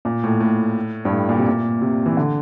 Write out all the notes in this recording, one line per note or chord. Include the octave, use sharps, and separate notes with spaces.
A#2
A2
A2
G2
A2
A#2
C3
A#2
C3
E3
D3